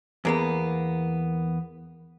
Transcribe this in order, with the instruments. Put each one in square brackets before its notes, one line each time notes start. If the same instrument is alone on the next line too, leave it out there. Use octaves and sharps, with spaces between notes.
[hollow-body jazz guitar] E2 A#3 B3